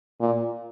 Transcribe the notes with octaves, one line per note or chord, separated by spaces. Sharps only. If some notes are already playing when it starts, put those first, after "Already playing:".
A#2